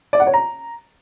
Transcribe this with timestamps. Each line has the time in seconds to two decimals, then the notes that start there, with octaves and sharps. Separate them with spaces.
0.13 D5
0.20 F#5
0.27 C#5
0.34 A#5